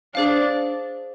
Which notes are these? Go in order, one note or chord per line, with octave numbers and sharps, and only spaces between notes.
D4 G#4 C5 F5